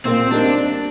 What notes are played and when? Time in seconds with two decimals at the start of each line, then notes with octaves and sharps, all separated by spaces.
0.05 A#2 C4
0.31 G3 A#3 D4 D#4